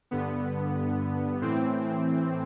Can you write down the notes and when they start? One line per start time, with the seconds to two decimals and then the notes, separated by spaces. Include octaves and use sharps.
0.11 G2 D3 B3
1.41 A2 E3 C4